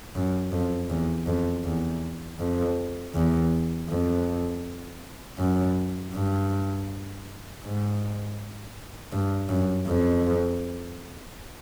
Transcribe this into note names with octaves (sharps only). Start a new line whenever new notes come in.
F#2
F2
E2
F2
E2
F2
E2
F2
F#2
G2
G#2
G2
F#2
F2